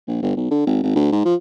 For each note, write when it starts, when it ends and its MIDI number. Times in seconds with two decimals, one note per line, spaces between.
0.07 0.22 34
0.22 0.32 31
0.36 0.48 35
0.51 0.62 50
0.66 0.83 32
0.83 0.90 32
0.95 1.09 38
1.12 1.22 44
1.25 1.35 53